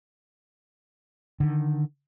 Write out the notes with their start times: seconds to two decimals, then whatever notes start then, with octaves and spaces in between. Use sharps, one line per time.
1.40 D3 D#3